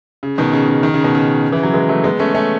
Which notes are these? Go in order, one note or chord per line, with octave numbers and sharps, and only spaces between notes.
C#3
B2 D#3
C#3
C#3
D#3
C#3
B2
C#3
E3
F#3
E3 G#3
F#3 A3
G#3 B3
A3 C#4
A3 C#4